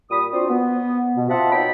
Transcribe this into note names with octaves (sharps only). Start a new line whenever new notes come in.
A#2 G3 B5 D#6
C4 D4 F4 F#4 C5 D5
B3
B2
C4 F4 D#5 E5 F#5 A5
B2 D#4 C#5 D#5 G5 B5